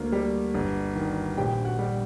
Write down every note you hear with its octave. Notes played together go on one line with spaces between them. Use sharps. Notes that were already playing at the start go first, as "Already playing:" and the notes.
Already playing: D2 A#3 A#4
G3
G1
D#3
A#1 G4 G5
F#4 F#5
G3